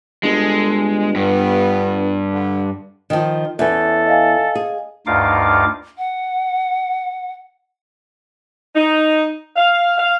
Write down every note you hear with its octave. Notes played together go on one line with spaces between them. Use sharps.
G1 G#3 A4
G2 B3
D3
D#3 F3
E2 C#4 A4
D#5 F5 G#5
G#4
D2 G2 D#4 F4 F5 D6
F#5
D#4
F5
F5